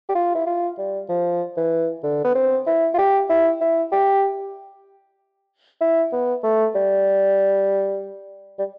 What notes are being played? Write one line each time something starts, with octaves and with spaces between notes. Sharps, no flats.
G4
F4
E4
F4
G3
F3
E3
D3
B3
C4
E4
F4
G4
E4
E4
G4
E4
B3
A3
G3
G3